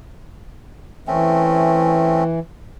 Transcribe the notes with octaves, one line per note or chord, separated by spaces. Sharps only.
E3 A3 C4 C#4